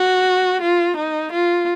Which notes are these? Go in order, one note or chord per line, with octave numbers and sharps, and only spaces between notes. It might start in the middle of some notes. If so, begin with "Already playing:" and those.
Already playing: F#4
F4
D#4
F4